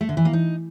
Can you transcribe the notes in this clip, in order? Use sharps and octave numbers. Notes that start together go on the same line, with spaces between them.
A3
D3
E3
A#3
D#4